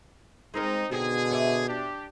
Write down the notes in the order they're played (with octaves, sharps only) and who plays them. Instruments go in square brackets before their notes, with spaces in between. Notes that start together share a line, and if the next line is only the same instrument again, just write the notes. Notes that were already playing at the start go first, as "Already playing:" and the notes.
[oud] G#3 C4 A#4 [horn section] D#4
[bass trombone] B2 [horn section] D3 G#4 [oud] D#4 G4
[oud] C#5 D5 E5
[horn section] D4 G4